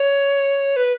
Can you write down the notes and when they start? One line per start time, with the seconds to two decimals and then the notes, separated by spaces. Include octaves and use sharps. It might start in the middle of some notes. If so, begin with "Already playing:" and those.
Already playing: C#5
0.76 B4